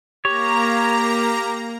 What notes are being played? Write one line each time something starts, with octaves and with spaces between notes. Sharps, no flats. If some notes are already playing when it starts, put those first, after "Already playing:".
A#3 G4 C#5 A#5